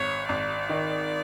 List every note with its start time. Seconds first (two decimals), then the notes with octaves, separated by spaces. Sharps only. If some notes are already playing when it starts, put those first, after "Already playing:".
Already playing: G#1 C#5
0.29 G#1 D5
0.69 D#3